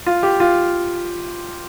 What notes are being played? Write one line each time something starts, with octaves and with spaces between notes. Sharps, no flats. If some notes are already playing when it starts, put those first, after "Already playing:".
F4
G4
F4